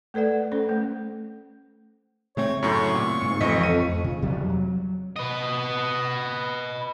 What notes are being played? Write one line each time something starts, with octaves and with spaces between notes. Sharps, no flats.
A3 A4 B4 D5 F#5
C#4 A4 C5
A3
C#3 A3 C4 C#5
F#2 A2 C#6
A#2
G#2
A1 F2 D#5 B6
D#7
C#3
F2 C3 F#3 G3
F#3
B4 D#5